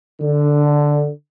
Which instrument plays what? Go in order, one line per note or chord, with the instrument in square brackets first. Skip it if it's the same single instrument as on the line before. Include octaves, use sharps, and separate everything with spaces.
[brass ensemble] D3